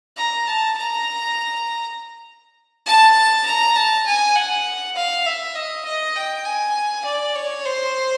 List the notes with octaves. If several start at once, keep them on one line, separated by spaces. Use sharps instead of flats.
A#5
A5
A#5
A5
A#5
A5
G#5
F#5
F5
E5
D#5
D#5
G5
G#5
D5
C#5
C5